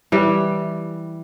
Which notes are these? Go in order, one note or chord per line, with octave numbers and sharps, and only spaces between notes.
E3 G3